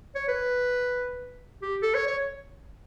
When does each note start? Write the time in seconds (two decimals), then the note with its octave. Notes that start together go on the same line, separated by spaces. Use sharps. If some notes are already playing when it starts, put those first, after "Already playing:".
0.15 C#5
0.28 B4
1.62 G4
1.82 A4
1.95 C#5
2.07 C#5